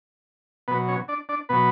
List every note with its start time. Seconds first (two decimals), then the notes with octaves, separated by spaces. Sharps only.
0.68 B2 F#3 B3 B4
0.88 C#4 C#5
1.08 D4 D5
1.29 D4 D5
1.49 B2 F#3 B3 B4